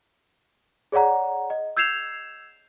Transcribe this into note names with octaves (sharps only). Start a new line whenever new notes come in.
G#4 C#5 D5 F#5 A#5
D#5
E6 G6 G#6 C7 E7 F7